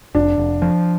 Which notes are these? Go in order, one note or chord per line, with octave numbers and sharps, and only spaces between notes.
F1 D4
F1
F3